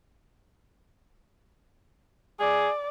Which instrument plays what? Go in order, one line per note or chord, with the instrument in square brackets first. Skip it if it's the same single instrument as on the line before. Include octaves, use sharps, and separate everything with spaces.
[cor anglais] G#4 [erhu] D5